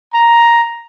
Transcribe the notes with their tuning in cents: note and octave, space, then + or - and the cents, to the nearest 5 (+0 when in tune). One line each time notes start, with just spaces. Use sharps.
A#5 +5